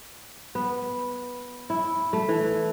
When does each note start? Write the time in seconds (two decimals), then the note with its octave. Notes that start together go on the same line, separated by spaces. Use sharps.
0.55 B3
1.70 E4
2.13 A3
2.29 E3